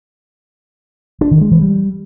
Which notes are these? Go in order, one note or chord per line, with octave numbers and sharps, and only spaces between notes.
D4
D#3
G#3
E3
G3